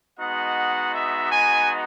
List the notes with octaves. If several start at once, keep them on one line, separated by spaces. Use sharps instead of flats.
G#3 B3 D#4 F#4 F#5
E5
G#5